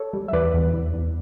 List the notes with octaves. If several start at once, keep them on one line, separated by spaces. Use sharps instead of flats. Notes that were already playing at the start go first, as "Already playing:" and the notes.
Already playing: A4 C#5
G3
E5
E2 B4 D5
E2
E2
E2